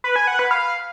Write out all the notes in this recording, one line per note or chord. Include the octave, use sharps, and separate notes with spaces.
B4
G#5
F#5
B4
F5